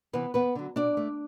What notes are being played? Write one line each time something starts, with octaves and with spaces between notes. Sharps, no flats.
C3 E3 B3 B4
E2 B3 B4
D3 F#3
B2 D4 D5
A3